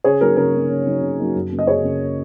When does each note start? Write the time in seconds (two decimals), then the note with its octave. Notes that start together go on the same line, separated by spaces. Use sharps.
0.04 C#3 G#4 C#5
0.21 F#3 A#3 D#4 A#4
0.37 C#3 A#4
0.54 F#3 A#3 D#4
0.70 C#3
0.86 F#3 A#3 D#4
1.02 C#3
1.18 F#3 A#3 D#4
1.35 F#2
1.52 C#3 A#3
1.59 D#5
1.67 F#2 G#4 C#5
1.83 C#3 A#3